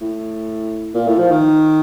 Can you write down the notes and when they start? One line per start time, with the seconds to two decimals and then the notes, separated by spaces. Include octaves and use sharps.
0.01 A2
0.95 A#2
1.07 A2
1.18 F3
1.31 D#3